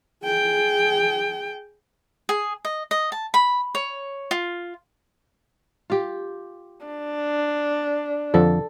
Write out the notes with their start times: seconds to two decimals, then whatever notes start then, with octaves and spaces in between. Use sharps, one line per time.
0.23 G#4 G5
2.29 G#4
2.65 D#5
2.91 D#5
3.12 A5
3.34 B5
3.75 C#5
4.31 F4
5.90 F4 G4
6.86 D4
8.34 F2 D3 F3 A4